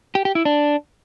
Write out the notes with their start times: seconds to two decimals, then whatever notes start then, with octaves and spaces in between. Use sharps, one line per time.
0.15 G4
0.25 G4
0.35 E4
0.45 D4